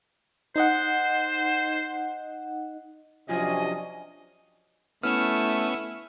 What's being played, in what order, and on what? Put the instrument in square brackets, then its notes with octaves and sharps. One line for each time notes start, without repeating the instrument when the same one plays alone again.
[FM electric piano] D#4 D#5 F#5 [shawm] C5
[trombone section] C3 C#4 [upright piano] F3 F#3 F4 [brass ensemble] D4 D#5 [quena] G#5
[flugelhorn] A3 [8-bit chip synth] B3 C#4 C#6 [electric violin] E4 E6 [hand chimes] F6